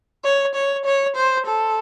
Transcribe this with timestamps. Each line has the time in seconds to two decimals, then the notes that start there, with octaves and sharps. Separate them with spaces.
0.24 C#5
0.55 C#5
0.85 C#5
1.16 C5
1.46 A4